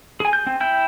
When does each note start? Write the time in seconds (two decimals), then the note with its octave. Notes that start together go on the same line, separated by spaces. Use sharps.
0.20 G#4 G#5
0.33 G6
0.47 C4
0.60 E4 G5 G6